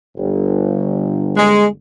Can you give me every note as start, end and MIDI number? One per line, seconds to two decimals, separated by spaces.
0.17 1.76 31
1.37 1.65 56